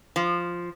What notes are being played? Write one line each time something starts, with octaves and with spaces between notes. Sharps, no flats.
F3